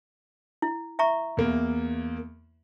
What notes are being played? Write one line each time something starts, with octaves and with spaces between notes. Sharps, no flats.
E4
E5 A#5 C#6
E2 A#3